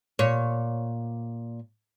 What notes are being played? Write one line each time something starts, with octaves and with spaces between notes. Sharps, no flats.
A#2 C#5